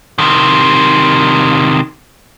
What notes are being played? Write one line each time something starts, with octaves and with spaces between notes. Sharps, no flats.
C3 D#3